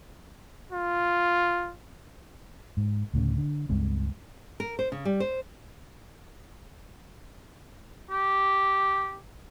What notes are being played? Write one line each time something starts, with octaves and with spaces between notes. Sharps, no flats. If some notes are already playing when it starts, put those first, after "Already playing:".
F4
G#2
D2 A2 C#3
D3
C#2 G2 G#3 C4
A#4
C5
C#3
G3
C5
G4